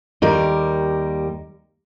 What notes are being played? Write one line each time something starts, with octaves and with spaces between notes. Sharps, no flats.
D#2 G3 A#4